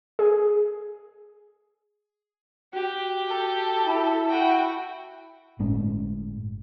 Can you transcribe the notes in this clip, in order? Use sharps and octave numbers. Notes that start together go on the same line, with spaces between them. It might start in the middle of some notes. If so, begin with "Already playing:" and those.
G#4
F#4 G4
A4
E4
F#4 G5
G1 A2 G#3 C#4